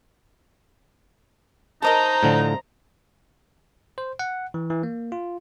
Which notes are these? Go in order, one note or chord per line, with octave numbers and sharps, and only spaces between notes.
D#4 A#4 C5 D#5 A5 A#5
A2 D3 F3
C5
F#5
E3
E3
A#3
F4